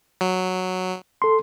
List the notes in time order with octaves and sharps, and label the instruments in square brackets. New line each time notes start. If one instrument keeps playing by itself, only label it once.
[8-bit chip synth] F#3
[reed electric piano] A4 C6